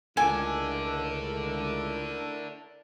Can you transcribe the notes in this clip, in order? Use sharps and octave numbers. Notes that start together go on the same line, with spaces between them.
C#2 A3 E4 A4 A#4 D5 G#5